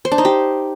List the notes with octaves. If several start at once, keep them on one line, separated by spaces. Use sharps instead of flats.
C5
D4
D#4
G4